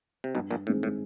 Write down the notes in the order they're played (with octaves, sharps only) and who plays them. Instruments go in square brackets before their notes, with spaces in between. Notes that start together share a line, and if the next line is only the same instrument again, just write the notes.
[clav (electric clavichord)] C3
[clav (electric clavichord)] B1 B2 [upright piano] G2
[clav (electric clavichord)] A#1 A#2
[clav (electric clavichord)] A2 [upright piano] D#3 G#3 C4
[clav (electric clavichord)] A2